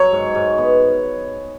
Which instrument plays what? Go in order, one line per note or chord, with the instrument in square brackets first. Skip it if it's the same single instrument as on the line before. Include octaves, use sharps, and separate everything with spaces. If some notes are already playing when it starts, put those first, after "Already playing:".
Already playing: [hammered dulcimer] F#3 [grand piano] C#5
[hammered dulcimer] G#2
G#2
B3